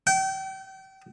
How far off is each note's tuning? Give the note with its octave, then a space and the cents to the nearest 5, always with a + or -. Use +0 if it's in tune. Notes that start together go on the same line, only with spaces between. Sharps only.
G5 -35